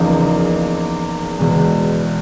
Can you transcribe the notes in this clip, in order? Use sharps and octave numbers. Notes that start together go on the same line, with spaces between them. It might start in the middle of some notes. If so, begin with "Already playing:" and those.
Already playing: E2 C#3 F3 A#3 D#4
E2 B2 G#3